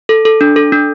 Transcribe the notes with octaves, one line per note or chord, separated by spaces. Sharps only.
A4
A4
D4
A4
D4